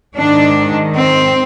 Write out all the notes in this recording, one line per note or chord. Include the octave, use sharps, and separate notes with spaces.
G#2 D#3 D4
C4